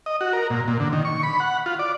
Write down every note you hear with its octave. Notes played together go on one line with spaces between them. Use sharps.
D#5
F#4
A#4
A#2
A#2
D3
D#3
C#6
B5
F#5
F4
D5